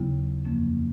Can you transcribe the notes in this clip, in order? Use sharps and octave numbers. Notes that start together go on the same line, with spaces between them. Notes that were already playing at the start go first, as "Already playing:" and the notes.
Already playing: D#2 C#3 F#3 B3 E4
F2 D3 F3 A#3 C#4